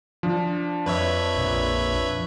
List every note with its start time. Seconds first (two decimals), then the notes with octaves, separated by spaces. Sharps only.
0.23 F3 D4
0.86 F2 B4 C#5 E5
1.36 A#1